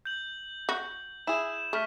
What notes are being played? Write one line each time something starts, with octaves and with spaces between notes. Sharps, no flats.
G6 F#7
F#4
E4 G#4 E7
A3 C#6 F6 B6